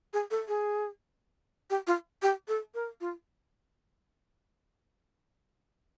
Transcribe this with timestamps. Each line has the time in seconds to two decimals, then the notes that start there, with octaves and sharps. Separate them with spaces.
0.13 G#4
0.31 A4
0.48 G#4
1.70 G4
1.87 F4
2.22 G4
2.48 A4
2.74 A#4
3.01 F4